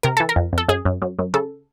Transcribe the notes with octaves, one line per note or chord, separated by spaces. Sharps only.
C3 A#4
E3 A4
A#4
F2
F2 A4
F#2 G#4
F#2
F#2
F#2
C#3 A4